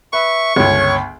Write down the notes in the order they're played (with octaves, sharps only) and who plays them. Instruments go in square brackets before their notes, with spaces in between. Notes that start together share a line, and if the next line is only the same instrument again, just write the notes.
[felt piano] B4 [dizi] E5 [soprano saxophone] C#6
[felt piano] G1 C#2 [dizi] C#5